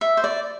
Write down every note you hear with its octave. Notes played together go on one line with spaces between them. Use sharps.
E5
C5
D5